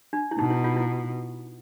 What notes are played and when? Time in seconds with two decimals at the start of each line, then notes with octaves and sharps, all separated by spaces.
0.13 D4
0.31 E4
0.38 B2 D#4
0.50 E4
0.64 F4
0.76 E4